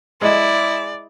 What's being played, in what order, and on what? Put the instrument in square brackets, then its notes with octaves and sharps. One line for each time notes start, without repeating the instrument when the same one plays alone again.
[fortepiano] G#3 [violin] E4 [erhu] D5